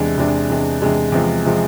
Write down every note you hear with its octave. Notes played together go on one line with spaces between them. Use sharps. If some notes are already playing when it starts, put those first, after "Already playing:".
Already playing: E2 C3 G#3 D4
E2 C3 G#3 D4
E2 C3 G#3 D4
E2 C3 G#3 D4
E2 C3 F3 G#3
C3 F3 G#3